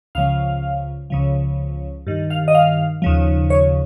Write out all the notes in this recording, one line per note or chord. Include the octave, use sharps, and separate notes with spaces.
C#2 C#3 F3 F5
C#2 C#3 F3
G2 D#3
F5
D#5
F5
D#2 C#3 F3
C#5